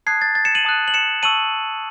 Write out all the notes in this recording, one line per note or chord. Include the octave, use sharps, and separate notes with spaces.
A5 D#6 F#6 G#6 C7
A6
A6
C#7 E7
D#7 F#7
A5 D#6 F#6
F#7
C#7 E7
A5 C#6 E6 D#7 F#7